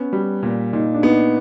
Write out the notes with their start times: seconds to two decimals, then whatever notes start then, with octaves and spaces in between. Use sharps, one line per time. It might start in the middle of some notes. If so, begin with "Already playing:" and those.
Already playing: B3 C#4
0.13 G3
0.43 A#2
0.73 A#2 D#4
0.94 D4
1.02 B3 D#4